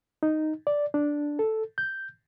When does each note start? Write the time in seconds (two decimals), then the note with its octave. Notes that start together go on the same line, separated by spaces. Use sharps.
0.23 D#4
0.67 D5
0.94 D4
1.39 A4
1.78 G6